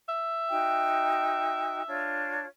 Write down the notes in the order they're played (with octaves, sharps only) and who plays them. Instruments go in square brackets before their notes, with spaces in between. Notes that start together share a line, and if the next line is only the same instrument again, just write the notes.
[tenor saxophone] E5
[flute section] D#4 F#4 G5
D4 F4 C#5